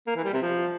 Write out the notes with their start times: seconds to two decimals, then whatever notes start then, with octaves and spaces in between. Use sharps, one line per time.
0.07 A#3
0.16 E3
0.24 G3
0.33 C3
0.42 F3